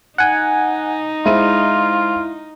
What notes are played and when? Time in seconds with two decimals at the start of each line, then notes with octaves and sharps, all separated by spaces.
0.18 D#4 F#5 G#5
1.26 G#3 E4 F4 C5 D#7